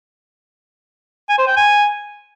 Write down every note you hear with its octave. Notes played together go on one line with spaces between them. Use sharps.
G#5
C5
G5
G#5